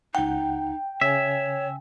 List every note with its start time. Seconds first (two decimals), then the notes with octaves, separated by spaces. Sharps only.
0.15 C#2 D#4 F#5 G5
1.01 C#3 C#5 E5 G#5